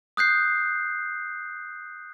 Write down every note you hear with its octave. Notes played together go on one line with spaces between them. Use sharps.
D#6 F#6 G6 C7